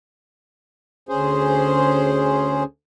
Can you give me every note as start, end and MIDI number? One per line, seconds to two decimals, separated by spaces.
1.09 2.63 38
1.09 2.63 61
1.09 2.63 68
1.09 2.63 72